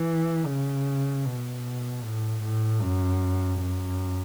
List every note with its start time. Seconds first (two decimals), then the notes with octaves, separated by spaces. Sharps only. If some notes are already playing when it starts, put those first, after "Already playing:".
Already playing: E3
0.46 C#3
1.25 B2
2.03 A2
2.42 A2
2.82 F#2
3.61 F#2